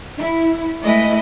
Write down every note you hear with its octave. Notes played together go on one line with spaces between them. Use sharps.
E4
G#3 A3 E4 B4 D#5